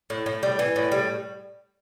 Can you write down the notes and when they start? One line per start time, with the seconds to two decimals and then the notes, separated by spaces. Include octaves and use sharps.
0.10 A2
0.26 A2
0.43 G3
0.59 E3
0.76 A2
0.92 G3